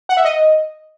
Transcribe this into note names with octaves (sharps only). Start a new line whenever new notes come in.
F#5
E5
D#5